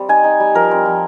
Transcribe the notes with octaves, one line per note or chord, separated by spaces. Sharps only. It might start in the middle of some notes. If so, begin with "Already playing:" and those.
Already playing: G3 C4
D#4 G#5
D#4
G3
F3 A#4
C4
F3